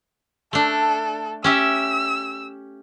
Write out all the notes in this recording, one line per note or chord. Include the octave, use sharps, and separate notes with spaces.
A3 D4 A4
C#4 G4 E5 E6